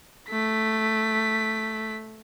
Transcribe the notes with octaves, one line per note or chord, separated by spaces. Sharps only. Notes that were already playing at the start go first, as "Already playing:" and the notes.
A3 B6